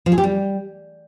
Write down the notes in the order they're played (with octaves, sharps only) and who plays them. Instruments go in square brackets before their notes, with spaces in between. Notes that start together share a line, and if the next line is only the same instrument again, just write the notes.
[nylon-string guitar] F3
G#4
G4
G3